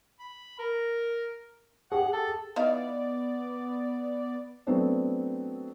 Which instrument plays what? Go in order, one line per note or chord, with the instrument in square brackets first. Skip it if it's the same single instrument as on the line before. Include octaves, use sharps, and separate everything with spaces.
[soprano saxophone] B5
A#4
[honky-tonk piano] G4 G#4 [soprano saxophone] F#5
[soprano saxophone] A4
[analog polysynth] B3 D5 [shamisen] D#4 E4 F5
[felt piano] F#3 A3 B3 C4 D4